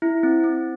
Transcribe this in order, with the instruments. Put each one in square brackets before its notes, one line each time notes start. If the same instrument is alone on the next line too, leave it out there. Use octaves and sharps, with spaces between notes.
[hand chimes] E4
C4
C4